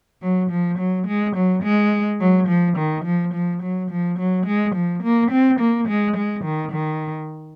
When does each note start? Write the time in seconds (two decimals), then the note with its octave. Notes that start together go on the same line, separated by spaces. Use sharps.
0.22 F#3
0.51 F3
0.78 F#3
1.07 G#3
1.35 F#3
1.63 G#3
2.20 F#3
2.48 F3
2.77 D#3
3.04 F3
3.34 F3
3.62 F#3
3.91 F3
4.19 F#3
4.46 G#3
4.75 F3
5.03 A#3
5.31 C4
5.60 A#3
5.88 G#3
6.16 G#3
6.44 D#3
6.72 D#3